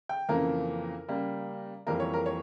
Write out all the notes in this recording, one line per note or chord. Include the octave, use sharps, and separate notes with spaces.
G5
F2 C#3 E3 A#3 A#4
C#3 G3 A#3
F2 E3 G3 A#3 A#4
C#5
A#4
C#5